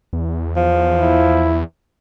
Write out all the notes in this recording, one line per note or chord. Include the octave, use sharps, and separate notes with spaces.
E2
F3
E4